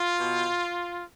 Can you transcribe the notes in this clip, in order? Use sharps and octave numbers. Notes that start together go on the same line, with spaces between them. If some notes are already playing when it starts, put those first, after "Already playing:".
Already playing: F4
B2